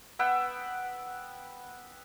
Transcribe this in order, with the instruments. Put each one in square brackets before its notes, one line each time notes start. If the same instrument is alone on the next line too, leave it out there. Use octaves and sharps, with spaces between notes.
[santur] B3 E5 F#5 G5